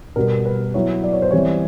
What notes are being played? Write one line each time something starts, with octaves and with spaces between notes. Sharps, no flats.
B2 G3 B3 A#4
B4
F#3 B3 E4 C#5
D5
C#5
C5
E3 G3 C4 C#5